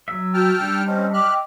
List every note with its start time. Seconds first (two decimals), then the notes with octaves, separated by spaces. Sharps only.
0.08 F#3 E5
0.34 F#4 G5 A5 E6 F6
0.61 G3 D4
0.86 C4 C#4 D#5 A5
1.13 E5 G5 D6 F6 F#6